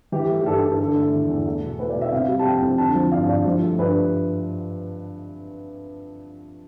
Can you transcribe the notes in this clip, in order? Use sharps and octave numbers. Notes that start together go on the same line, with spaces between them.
E3 G4
A3
G4
G2 A4
G2 A4
D3 A4
A3
E2
E2
A3
B2
A3 B4
D5
B2
E5
C3 F5
G3
A5
F2 G5
F2
D3 A5
F3
G2 F5
G2 D5
F3
A3
G2 B4